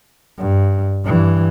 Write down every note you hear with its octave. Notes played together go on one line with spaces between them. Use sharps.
G2
G2 E3